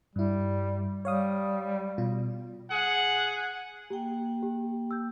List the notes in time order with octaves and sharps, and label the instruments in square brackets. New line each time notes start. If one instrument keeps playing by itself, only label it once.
[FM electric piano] G2 E4 [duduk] G3
[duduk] G3 [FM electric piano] C#5 F5 D#6
[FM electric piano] B2 F4
[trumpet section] G#4 F#5
[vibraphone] A#3 G5 [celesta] G4
[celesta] G4
E6 G6